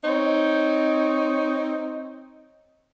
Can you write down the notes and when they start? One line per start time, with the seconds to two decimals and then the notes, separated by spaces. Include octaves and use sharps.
0.04 C4 D#4 C#5